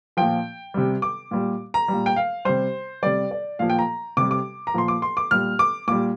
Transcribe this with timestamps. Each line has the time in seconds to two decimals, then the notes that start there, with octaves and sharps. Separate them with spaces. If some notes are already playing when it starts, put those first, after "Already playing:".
0.17 A#2 F3 G5
0.74 C3 G3
1.02 D6
1.31 A#2 G3
1.74 A#5
1.88 A#2 G3
2.06 G5
2.16 F5
2.45 C3 G3 C5
3.03 C3 G3 D5
3.31 D5
3.59 A#2 F3 F5
3.70 G5
3.79 A#5
4.17 C3 G3 D6
4.31 D6
4.67 A#5
4.74 A#2 F3 C6
4.88 D6
5.02 C6
5.17 D6
5.31 A#2 G3 F6
5.59 D6
5.88 A#2 G3 D6